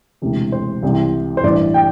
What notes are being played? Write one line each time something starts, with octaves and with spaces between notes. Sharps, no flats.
E1 D2 C3 E3
C5
C2 C3 E3
C5
A1 G2 E3 D5
G5